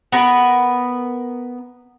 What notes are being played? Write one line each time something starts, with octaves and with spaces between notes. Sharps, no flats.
B3 A#4 B4